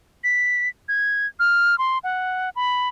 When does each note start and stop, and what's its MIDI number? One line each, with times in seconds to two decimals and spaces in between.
0.24 0.69 95
0.89 1.27 92
1.39 1.78 89
1.78 1.98 84
2.04 2.50 78
2.56 2.89 83